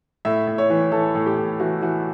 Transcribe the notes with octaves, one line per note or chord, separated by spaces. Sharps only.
A2 E5
A2
C#5
E3
E3 A4
A2
G4
A2
E3 F#4
E3 F#4